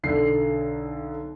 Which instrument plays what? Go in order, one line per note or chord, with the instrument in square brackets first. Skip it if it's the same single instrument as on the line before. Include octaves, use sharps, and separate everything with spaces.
[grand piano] B1 D3 C7